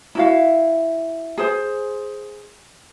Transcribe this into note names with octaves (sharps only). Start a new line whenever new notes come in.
E4 F#4 F5
G#4 C5